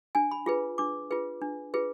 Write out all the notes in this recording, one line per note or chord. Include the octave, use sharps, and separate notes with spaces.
D4 G#5
B5
F4 G#4 B4
D4 D6
F4 G#4 B4
D4
F4 G#4 B4